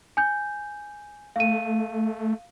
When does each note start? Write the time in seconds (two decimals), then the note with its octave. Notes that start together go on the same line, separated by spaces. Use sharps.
0.17 G#5 G6
1.36 A3 F5 D#7